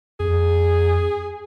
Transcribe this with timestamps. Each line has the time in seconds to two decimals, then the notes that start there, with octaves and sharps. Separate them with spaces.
0.20 F2 G#4